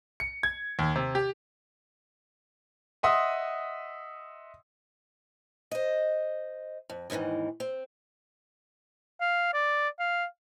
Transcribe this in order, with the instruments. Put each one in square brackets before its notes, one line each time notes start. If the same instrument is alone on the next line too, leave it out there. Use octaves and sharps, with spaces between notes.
[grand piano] C#7
G#6
D#2
C3
G4
D#5 E5 F#5 C6 D#6
[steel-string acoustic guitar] C5 D#5
F2
D#2 G#2 C3 D#3 E3
C4
[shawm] F5
D5
F5